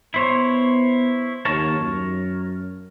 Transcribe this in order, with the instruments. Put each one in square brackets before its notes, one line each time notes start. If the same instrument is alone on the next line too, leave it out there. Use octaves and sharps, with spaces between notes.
[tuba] B3 [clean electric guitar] E4 C5 C#5
[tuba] D#2 [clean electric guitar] A#4 C#5 A5
[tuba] F#2